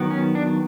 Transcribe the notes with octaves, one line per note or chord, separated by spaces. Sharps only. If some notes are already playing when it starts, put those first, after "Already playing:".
Already playing: D#3 F#3 B3
C#4
D4